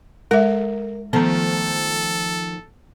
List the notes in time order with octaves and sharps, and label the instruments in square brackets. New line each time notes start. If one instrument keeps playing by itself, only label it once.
[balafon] G#3 E5 [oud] A#4
[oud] D#3 F3 A3 [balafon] B3 A#5 [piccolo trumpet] A4